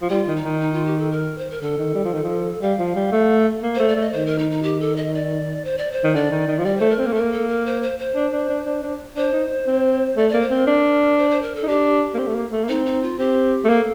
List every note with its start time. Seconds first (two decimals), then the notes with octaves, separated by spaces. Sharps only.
0.02 F3
0.10 G3 F4
0.27 D#3
0.36 D#4
0.44 D#3
0.61 D#4
0.73 F4
0.86 G4
0.98 A4
1.11 A#4
1.38 C5
1.50 A#4
1.62 D3 A4
1.78 D#3
1.95 G3
2.05 F3
2.13 D#3
2.23 F3
2.62 G3 F5
2.79 F3
2.96 G3
3.12 A3
3.63 A#3
3.75 A3 C5
3.88 D5
3.96 A3
4.01 D#5
4.13 D#3 C5
4.26 A#4
4.38 D#4
4.51 D#4
4.63 G4
4.80 A4
4.96 D#5
5.14 D5
5.64 C5
5.78 D5
5.92 C5
6.04 D#3
6.15 D3 D5
6.31 D#3
6.48 D#3
6.59 F3
6.65 G3 D5
6.77 A3 C5
6.89 A#4
6.99 C4
7.02 A#4
7.06 A#3
7.13 A3 A#4
7.21 A#3
7.32 A4
7.48 A#4
7.66 C5
7.82 C5
7.99 C5
8.15 D4
8.32 D4
8.49 D4
8.66 D4
8.83 D4
9.16 D4 C5
9.33 D#4
9.67 C4
10.17 A3 D5
10.29 A#3 D5
10.41 C5
10.51 C4 A#4
10.67 D4
11.18 C5
11.30 C5
11.42 A#4
11.55 A4
11.63 D#4
11.68 D4 G4
12.14 A#3
12.18 C4
12.27 A3
12.35 A#3
12.52 A3
12.64 A#3
12.69 C4 D#4
12.86 D#4
13.02 F4
13.19 C4 G4
13.65 A3
13.69 A#3 A4